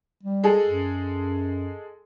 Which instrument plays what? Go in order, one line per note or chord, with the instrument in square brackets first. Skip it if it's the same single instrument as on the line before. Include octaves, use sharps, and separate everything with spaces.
[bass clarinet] G3
[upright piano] G#3 G#4 A4
[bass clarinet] F#2